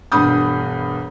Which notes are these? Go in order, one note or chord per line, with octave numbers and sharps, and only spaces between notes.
E1 G2 B5 D#6 G6